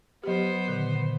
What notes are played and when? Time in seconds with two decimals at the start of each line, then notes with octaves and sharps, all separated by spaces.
0.24 F#3 B3 G4 C5
0.67 A#2 D3 D#3